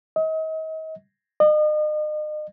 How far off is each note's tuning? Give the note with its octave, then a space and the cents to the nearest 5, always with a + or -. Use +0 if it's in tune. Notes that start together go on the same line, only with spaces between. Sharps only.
D#5 +35
D#5 -40